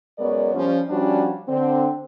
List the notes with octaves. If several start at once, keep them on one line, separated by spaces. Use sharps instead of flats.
F#2 G#3 B3 A#4 C#5 D5
F3 G3 C#4
F3 G3 C#4 D4 F#4
D3 C4